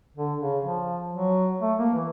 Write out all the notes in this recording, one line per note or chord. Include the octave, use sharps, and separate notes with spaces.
D3
C#3
F3
F#3
A3
A#3
E3